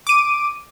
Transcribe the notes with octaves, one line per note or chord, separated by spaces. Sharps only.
D6 D7 D#7